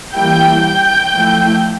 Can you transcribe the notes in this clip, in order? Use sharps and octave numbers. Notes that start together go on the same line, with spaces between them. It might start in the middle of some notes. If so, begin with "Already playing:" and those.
E3 G3 A#3 E4 G5 G6
G5 G6
F3 A3 E4